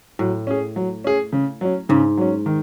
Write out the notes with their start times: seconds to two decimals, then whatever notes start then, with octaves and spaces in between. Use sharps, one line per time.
0.19 A2 F#3
0.47 C#4 G#4
0.76 F#3
1.04 C#4 G#4
1.32 C#3
1.61 F#3 C#4
1.89 G#2 C#3
2.17 F#3 C#4
2.46 D#3